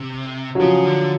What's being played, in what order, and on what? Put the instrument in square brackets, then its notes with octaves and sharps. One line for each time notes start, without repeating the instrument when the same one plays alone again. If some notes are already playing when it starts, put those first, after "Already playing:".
Already playing: [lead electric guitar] C3
[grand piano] F#3
[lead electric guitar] C#3 [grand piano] F3
[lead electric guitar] D3